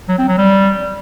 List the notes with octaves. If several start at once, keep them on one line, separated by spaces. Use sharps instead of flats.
F#3
C4
F#3
G3